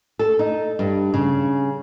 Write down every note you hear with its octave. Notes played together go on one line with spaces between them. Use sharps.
A4
D#4
G2
C#3